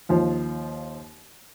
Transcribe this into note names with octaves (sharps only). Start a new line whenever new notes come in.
D#2 F3